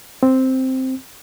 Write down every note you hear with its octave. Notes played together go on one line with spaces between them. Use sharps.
C4